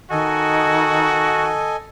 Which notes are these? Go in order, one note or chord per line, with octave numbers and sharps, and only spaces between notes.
D#3 F#4 A4 D#5 G#5